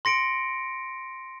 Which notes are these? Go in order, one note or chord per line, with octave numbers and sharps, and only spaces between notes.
C6 A#6 C#7 D7